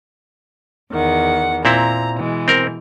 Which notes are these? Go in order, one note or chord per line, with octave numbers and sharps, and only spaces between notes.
E2 D#3 F#5
A#2 C4 E4 A#5
B2 E3 G#3
C4 A#4